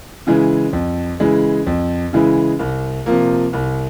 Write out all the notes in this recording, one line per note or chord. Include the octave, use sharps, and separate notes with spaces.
C#3 E3 G#3 E4
F2
C#3 E3 G#3 E4
F2
C#3 E3 G#3 E4
C2
C3 F3 A#3
C2